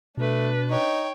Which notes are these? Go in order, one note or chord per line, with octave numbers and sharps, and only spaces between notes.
B2 A3 D4 B4
D#4 C#5 G5